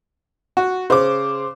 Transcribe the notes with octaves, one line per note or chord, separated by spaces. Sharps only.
F#4
C#3 C5 D6